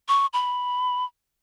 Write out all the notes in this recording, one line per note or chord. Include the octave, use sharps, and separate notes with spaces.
C#6
B5